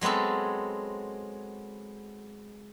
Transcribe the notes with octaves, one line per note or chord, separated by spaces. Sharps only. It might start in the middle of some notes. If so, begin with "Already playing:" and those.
F#3 G#3 B3 C4 A4